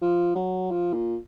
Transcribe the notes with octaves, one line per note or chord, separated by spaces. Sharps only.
F3
F#3
F3
A#2